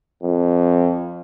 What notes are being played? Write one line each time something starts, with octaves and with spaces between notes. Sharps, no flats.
F2